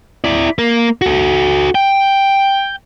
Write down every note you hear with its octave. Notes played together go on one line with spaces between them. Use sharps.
E4 D5
A#3
F#4 A4
G5